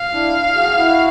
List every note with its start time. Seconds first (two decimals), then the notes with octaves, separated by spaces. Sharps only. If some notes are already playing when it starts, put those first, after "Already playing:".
Already playing: F5
0.14 D4 E4
0.55 F#4 G#4
0.77 E4 F#4